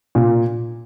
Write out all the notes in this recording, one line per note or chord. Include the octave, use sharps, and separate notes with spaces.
A#2